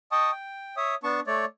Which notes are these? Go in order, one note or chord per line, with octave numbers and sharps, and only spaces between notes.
D#5 G5 A5 C#6 D#6
G5
C#5 E5 D#6
B3 D4 A5 C#6
A3 C#5 D5